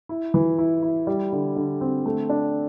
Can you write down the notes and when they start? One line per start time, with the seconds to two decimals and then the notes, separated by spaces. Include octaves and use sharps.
0.09 E4
0.34 E3
0.58 E4
0.82 E4
1.07 G3
1.32 D3
1.56 D3
1.81 C4
2.06 A3
2.30 D4